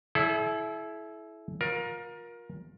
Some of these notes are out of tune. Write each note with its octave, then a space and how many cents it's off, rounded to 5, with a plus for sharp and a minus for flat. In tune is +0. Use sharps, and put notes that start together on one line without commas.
E4 +0 A4 -45 D5 -45
F4 +35 A#4 +20